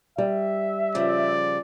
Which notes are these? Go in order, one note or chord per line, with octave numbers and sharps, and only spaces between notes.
G3 E5
C#3 F3 D5